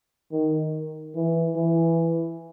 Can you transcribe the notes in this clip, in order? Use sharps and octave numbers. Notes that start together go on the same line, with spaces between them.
D#3
E3
E3